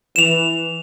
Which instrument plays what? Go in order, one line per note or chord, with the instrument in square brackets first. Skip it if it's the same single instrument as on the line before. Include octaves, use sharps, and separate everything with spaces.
[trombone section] E3 [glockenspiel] E7 F7